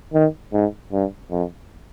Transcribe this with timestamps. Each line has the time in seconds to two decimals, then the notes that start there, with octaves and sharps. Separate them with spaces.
0.14 D#3
0.53 G#2
0.92 G2
1.31 F2